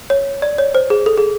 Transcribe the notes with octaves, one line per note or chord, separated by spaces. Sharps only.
C#5
D5
C#5
C5
G#4
A4
G#4